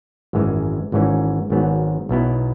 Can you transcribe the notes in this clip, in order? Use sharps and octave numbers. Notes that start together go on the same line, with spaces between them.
G#1 F#2 E3 G#3
G#1 G#2 E3 C#4
G#1 G#2 F#3 B3
B1 B2 B3 E4